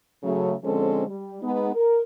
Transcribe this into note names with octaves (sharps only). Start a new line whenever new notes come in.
C#3 F#3 A3
D3 F3 G#3 C4 C#4 A4
G3
G#3 B3 D#4
A#4